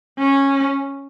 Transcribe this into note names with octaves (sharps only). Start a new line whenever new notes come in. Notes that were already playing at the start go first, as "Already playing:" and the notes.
C#4